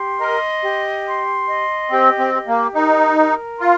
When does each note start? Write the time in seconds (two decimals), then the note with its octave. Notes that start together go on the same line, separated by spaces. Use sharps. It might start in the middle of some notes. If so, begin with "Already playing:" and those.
Already playing: G4 C6
0.19 A#4 D#5
0.63 G4
1.06 C6
1.47 D#5
1.90 C4 G4
2.19 C4
2.33 G4
2.47 A#3
2.75 D#4 A#4
3.18 A#4
3.60 F4 F5